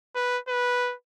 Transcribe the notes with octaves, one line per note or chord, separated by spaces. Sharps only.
B4
B4